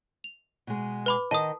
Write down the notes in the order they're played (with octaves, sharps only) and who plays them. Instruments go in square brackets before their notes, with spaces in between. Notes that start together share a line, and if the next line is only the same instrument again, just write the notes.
[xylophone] F7
[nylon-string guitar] B2 G#3
[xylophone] B4 B5 D6
[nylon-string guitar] D#3 D#5 [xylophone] A5 D#6